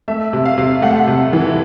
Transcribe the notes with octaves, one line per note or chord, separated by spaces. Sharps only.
A3 E5
C3
F5
C3
A3 F#5
C3
E3